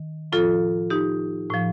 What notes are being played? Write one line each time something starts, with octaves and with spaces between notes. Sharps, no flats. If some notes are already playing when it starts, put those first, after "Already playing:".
Already playing: D#3
A2 F3 F4 A4
D#4 G4
A2 F3